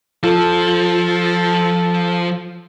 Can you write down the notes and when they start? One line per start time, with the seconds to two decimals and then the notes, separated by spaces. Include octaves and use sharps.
0.24 F3 F4 A4